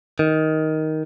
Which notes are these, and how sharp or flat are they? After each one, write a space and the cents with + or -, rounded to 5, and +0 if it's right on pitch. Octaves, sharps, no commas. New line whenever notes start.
D#3 +10